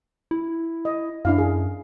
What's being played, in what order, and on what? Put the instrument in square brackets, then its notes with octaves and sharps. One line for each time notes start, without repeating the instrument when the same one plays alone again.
[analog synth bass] E4
[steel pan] D#5
[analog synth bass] F#2 [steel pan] D4 E4 F5
[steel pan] G#4